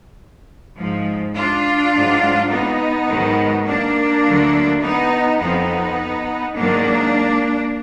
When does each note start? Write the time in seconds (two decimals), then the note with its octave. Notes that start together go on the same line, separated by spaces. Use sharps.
0.78 G#2 F3
1.36 D4 F4
1.94 G#2 F#3
2.51 B3 D#4
3.09 G#2 D#3 F#3
3.67 A#3 D4
4.25 D2 D3 F#3
4.83 B3 D#4
5.41 F2 F3 B3 D#4
6.56 G#2 D#3 F#3 A#3 D4